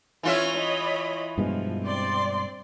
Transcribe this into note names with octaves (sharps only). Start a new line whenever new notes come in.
E3 C#4 F4 C#5 E5
C#5 D#5 B5
G2 B2 F3 G#3
C4 D5 C6